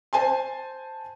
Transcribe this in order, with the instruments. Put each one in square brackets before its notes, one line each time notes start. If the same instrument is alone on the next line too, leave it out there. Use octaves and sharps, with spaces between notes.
[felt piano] C5 G#5 A5 C6